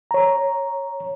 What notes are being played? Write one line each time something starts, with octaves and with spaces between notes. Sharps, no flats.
C#5 A#5